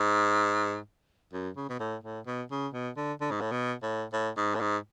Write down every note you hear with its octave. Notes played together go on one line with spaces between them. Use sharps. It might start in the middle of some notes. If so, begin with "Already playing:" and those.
Already playing: G#2
F#2
C#3
B2
A2
A2
B2
C#3
B2
D3
D3
G#2
A2
B2
A2
A2
G#2
A2
G#2